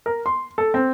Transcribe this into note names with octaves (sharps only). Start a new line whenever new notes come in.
A#4
C6
A4
C4